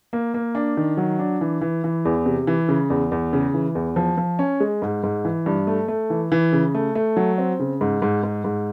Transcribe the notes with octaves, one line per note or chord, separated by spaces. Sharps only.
A#3
A#3
D4
D#3
F#3
D4
E3
E3
E3
E2
C3
E3
C#3
E2
E2
C#3
E3
E2
F3
F3
C#4
G#3
G#2
G#2
E3
G2
A3
A3
E3
E3
C#3
A3
A3
F#3
C4
C#3
G#2
G#2
G#2
G#2